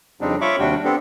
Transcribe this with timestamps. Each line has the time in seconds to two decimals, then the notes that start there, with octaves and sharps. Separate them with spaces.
0.21 F2 C#3 G3 C4 D4 D#4
0.41 F4 C#5 E5 B5 C#6 D6
0.59 D#2 C3 G3 D4 F#4 G5
0.84 B3 C4 D4 G4 A4